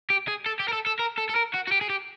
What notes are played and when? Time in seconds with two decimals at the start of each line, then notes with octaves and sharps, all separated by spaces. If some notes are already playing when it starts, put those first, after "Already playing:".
0.10 G4
0.28 G#4
0.46 A4
0.60 G4
0.68 A#4
0.73 A4
0.86 A4
0.99 A#4
1.18 A4
1.30 A4
1.36 A#4
1.54 F#4
1.68 F#4
1.72 G4
1.81 G#4
1.89 G4